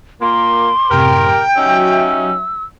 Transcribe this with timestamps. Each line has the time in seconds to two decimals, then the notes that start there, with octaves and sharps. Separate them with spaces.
0.22 A#2 A#3 C6 D6
0.90 F#2 A2 C3 G4 A#4 G5
1.57 F#3 C#4 D#4 F#4 G4 E5 E6